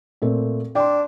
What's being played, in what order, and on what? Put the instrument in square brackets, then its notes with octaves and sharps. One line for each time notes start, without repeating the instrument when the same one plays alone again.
[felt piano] A#2 A3 C4
[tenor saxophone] D4 [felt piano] G5 C6